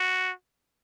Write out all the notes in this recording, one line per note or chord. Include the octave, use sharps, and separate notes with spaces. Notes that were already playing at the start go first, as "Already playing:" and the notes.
Already playing: F#4